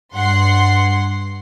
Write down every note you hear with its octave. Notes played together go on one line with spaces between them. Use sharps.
G2 F#5 C6 C7